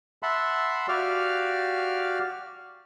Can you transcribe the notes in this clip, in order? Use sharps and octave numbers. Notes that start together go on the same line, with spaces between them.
E5 F#5 A5 B5 C6
F#4 G4 D5 F5 F6